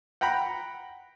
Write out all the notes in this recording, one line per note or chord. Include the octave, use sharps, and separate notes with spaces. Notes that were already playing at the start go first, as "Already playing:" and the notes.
F#5 G5 A#5 B5